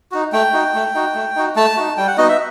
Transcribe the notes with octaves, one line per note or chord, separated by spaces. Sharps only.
D#4 F#4
A3 G5
D#4 F#4
A3
D#4 F#4
A3
D#4 F#4
A3 A5
D#4 F#4
G3 G5
F#5
B3 D#4 F#4 D#5
E5